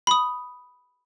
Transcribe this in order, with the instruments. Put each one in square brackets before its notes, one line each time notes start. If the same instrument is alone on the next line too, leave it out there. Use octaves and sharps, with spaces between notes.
[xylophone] B5 D#6